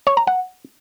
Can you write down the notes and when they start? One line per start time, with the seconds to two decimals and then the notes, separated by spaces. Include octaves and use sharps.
0.07 C#5
0.17 A#5
0.27 F#5